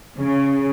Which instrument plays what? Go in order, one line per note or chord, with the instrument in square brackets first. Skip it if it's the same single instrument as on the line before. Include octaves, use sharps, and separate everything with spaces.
[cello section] C#3